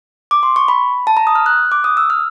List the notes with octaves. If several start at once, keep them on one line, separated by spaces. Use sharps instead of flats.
D6
C6
C#6
B5
A5
A#5
D#6
F6
F#6
D6
D#6
E6
F6